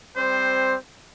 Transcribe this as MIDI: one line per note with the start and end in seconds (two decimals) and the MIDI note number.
0.17 0.75 55
0.17 0.75 60
0.17 0.75 72